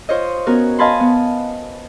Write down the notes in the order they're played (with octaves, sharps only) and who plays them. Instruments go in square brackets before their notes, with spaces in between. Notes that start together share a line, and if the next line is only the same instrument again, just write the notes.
[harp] F4 C5 C#5 D#5
B3 C#4 F#4 A#4 G#5
D#5 F5 G#5 A5 B5 C6
B3